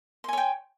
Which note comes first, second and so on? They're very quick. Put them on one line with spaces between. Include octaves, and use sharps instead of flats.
C6 G#5 C#5 G5